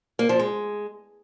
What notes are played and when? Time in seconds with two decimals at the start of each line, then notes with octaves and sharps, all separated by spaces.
0.19 A#3
0.29 F3
0.39 G#3